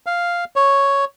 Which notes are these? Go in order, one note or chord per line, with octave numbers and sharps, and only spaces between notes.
F5
C#5